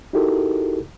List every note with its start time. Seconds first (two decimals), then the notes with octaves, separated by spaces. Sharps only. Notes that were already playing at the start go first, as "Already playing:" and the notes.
0.13 D#4 E4 F#4 G4 A4 A#4